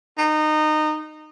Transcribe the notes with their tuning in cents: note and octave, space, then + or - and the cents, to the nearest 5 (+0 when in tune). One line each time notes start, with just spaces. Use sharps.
D#4 -20